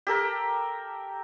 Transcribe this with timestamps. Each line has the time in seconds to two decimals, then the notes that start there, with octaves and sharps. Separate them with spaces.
0.07 G4 A4 A#4